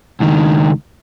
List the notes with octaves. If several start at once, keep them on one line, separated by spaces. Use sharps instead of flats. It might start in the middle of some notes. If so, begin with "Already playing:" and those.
C#2 D#3